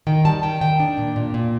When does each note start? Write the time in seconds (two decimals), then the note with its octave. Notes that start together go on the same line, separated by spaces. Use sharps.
0.07 D#3 G5
0.25 G3 A5
0.43 D#3 G5
0.61 D#3 G5
0.80 D4
0.98 A#2
1.16 A#2
1.34 A#2